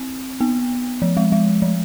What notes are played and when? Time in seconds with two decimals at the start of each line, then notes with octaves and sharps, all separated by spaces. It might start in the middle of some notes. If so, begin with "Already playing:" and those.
Already playing: C4
0.41 B3
1.02 F3
1.17 G#3
1.32 G#3
1.62 F3